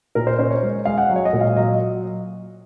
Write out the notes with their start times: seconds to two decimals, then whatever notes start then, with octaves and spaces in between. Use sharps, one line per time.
0.15 A#2 A#4
0.27 C5
0.38 C#4 C5
0.51 C#5
0.63 G#3
0.85 G#3 F5
0.98 F#5
1.10 F#3
1.16 C#5
1.25 D#5
1.33 A#2
1.41 F5
1.56 F#3 D#5